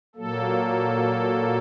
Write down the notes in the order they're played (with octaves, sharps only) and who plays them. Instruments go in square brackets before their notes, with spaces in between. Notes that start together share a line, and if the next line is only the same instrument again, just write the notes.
[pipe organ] A#2 F#3 A#3 A4